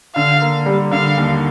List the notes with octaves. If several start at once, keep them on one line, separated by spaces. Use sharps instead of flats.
D3 F5
A#3
G3
D3 F5
D#2